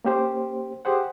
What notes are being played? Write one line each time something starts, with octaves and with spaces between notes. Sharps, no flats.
A#3 C#4 G4 C5
G4 G#4 C5 F#5